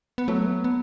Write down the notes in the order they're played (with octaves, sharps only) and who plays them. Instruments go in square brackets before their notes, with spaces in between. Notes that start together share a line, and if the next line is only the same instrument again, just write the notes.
[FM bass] B3
[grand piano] F#3 [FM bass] A3
[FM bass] B3
B3